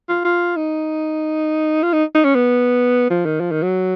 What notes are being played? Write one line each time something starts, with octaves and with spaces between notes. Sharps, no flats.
F4
F4
D#4
F4
D#4
D#4
C#4
B3
F3
D#3
F3
D#3
F#3